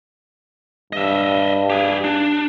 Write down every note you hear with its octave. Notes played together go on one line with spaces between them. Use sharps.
G2 D#5 E5
G4 G#4
D4